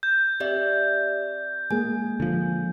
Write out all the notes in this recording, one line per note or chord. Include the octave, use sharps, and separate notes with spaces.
G6
C4 G4 D5 E5
G#3 A#3 G#4 G#5
D3 F3